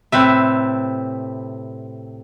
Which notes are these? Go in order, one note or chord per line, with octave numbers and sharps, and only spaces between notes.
A2 C3 C4 B4 E5